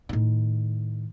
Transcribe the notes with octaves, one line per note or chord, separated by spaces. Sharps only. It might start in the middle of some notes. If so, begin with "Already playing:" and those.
A2 D#3